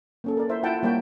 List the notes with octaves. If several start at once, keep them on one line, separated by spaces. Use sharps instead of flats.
A#3 C#4 A4
A#4 D5
E4 C5 E5
E4 F4 F#5 G5 A5
G3 A#3 C#5 D5 G5 B5